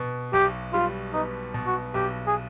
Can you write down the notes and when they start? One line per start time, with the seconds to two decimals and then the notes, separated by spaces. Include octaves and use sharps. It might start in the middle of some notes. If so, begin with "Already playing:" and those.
Already playing: B2 B3
0.33 B1 G4
0.74 G3 F4
1.14 B3 D#4
1.54 B2
1.67 F#4
1.94 B1 G4
2.27 G#4